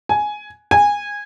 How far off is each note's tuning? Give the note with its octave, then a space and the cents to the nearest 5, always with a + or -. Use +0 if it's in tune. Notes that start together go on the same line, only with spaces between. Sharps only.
G#5 +10
G#5 -15